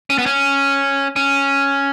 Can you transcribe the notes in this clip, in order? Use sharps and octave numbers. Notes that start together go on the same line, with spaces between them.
C#4
B3
C#4
C#4